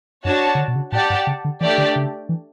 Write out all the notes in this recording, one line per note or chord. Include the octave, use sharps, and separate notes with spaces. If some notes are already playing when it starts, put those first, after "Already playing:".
F#2 D4 F#4 C#5 F#5 A5
C#3
D3
B2
C#3
A2 G4 D5 F#5 A5
G2
C#3
D3
E3 A3 D4 G4 D5
D3
C#3
E3